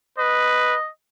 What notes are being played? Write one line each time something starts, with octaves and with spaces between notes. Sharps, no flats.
B4 D#5